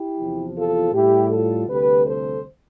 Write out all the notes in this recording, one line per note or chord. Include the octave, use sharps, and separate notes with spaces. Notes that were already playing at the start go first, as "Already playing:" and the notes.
Already playing: E4 G4
E2 C3 F3
F4 A4
A2 G3 E4 G4
F4 A4
D2 C3 G3 G4 B4
A4 C5